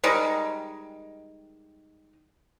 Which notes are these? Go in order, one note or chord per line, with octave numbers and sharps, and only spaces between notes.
D#3 G3 G#3